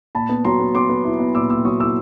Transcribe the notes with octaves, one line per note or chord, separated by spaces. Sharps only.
A#2 A5 B5
B3
F#3 A#5 C6
B3
B3 C6 D6
B3
E4
B3
A#2 D6 E6
A#2 D6 E6
F#3 C#6 D#6
E4 D6 E6